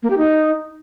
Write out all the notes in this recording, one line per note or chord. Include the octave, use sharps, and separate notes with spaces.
A#3
G4
D#4